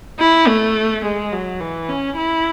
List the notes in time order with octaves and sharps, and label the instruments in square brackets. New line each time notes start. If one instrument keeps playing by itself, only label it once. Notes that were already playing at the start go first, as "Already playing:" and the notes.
[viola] E4
A3
G#3
F#3
E3
C#4
E4